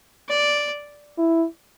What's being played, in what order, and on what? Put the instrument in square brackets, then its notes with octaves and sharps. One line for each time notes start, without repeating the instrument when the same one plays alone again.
[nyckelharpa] D5
[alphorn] E4